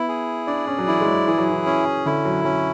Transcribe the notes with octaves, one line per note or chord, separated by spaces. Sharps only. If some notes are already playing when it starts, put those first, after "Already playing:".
Already playing: B3 E4
G#4
D4 D5
C#4
F#3
E3 E4
G#3
F#3
E3 G#4
F#3
E3
C#4
D3 E4
F#3
F#3 C#4